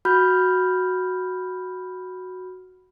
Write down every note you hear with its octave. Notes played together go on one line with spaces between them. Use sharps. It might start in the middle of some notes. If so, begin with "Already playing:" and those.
F#4 B5 F6 G6